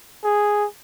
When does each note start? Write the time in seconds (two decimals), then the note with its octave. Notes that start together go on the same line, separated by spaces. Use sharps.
0.24 G#4